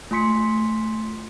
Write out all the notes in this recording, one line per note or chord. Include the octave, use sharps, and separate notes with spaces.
A3 F4 G#5 C6 B6 C#7